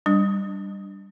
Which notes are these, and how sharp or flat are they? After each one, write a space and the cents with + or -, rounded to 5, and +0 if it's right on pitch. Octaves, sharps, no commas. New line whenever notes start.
G3 +0 D4 +0